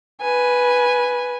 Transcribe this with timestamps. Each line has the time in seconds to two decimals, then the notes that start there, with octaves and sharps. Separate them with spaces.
0.22 B4 G#5